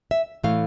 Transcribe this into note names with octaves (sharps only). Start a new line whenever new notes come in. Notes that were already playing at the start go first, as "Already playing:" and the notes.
E5
A2 E3 A3 F5